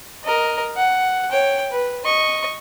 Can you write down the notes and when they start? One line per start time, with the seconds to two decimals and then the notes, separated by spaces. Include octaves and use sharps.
0.24 A#4 D#5
0.76 F#5
1.31 C#5 G5
1.72 B4
2.05 D#5 C#6